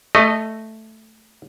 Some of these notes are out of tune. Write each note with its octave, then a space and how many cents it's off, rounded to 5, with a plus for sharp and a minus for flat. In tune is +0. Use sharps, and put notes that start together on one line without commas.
A3 +0 D#5 -15